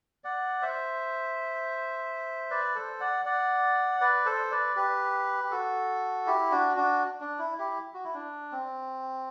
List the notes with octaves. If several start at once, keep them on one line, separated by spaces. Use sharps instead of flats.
D5 F#5
C5 E5
B4 D5
A4 C5
D5 F#5
D5 F#5
B4 D5
A4 C5
B4 D5
G4 B4
G4
F#4 A4
E4 G4
D4 F#4
D4 F#4
D4
E4
E4 G4
F#4
E4
D4
C4